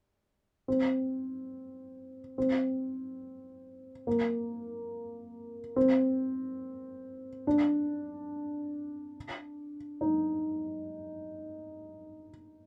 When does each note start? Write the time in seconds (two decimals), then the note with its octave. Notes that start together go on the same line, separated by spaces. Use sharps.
0.68 C4
2.38 C4
4.07 A#3
5.76 C4
7.47 D4
10.01 D#4